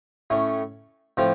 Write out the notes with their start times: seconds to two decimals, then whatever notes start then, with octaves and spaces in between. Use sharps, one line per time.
0.30 A2 A3 C#4
1.17 A2 F3 C4 F4